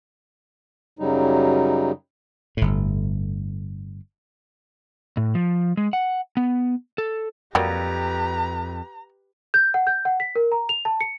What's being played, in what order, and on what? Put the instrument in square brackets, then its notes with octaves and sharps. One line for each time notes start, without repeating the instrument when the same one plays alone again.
[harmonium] F#2 C#3 F#3 G3 D#4
[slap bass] G1 A2
[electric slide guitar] A2
F3
G#3
F#5
B3
A4
[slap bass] F2 [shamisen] F#3 G3 A#3 [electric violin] G4 B4 [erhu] A#5
[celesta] G6
F#5
G6
F#5
B6
A#4
A#5
F7
A5
C#7